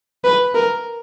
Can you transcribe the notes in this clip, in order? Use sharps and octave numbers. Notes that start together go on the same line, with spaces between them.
B4
A#4